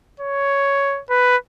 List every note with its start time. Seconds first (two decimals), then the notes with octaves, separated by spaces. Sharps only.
0.20 C#5
1.10 B4